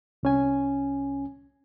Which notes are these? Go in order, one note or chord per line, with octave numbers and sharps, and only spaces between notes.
C2 C#4 G#5